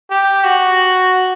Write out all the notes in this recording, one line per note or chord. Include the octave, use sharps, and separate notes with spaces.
G4
F#4